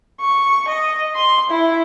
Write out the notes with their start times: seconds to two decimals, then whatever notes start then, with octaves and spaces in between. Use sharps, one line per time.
0.21 C#6
0.68 D#5
1.15 C6
1.50 E4